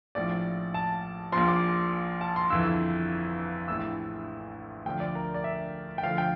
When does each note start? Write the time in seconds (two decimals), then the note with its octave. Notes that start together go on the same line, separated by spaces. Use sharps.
0.15 A#1 A2 F3 D5
0.74 A5
1.32 A#1 A#2 F3 C6
1.48 D6
2.21 A5
2.36 C6
2.50 G1 F2 E3 E6
3.68 A#1 A2 E3 E6
4.85 D2 D3 F3 G5
5.00 D5
5.15 A#4
5.34 D5
5.44 E5
5.98 G5
6.03 D2 D3 F3 F5
6.18 G5